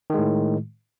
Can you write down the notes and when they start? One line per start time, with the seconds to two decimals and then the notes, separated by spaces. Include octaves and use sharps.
0.10 D#3
0.14 G#3
0.19 A2